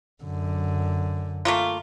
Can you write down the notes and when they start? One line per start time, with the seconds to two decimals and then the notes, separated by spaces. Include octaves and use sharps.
0.23 F#2 D3
1.45 A3 A#3 F4